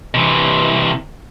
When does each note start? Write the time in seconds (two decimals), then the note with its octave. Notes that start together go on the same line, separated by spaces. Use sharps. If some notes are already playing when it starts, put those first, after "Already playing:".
0.14 C3 E3